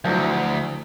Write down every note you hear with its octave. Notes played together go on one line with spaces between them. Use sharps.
D2 F3 F#3 E4